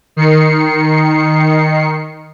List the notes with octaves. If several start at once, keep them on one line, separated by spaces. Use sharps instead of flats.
D#3 C7 C#7